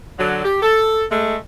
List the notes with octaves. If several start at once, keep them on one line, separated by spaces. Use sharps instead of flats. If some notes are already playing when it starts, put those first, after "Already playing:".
D3 F#3
G4
A4
G#3 A3